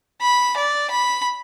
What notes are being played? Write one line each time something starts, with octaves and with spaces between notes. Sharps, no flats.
B5
D5
B5